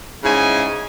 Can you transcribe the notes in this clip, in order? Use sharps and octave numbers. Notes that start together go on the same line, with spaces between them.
G#2 C#3 E4 D#5 G#5